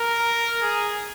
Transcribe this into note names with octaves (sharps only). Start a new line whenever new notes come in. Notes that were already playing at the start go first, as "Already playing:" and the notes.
Already playing: A#4
G#4